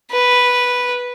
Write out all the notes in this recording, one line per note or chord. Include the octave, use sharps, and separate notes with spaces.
B4